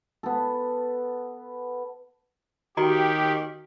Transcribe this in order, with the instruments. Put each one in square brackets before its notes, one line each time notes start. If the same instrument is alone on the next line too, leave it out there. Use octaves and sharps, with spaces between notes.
[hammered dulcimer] B3 A4
[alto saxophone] D#3 [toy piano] F#4 D#5 A#5 [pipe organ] G4